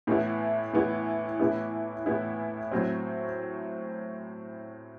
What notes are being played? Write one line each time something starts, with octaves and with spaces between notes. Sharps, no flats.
A2 E3 B3 E4
A2 E3 B3 E4
A2 E3 B3 E4
A2 E3 B3 E4
A2 F#3 C4